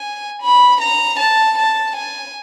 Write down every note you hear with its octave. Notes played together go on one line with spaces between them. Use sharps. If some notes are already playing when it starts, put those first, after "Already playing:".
Already playing: G#5
B5
A#5
A5
A5
G#5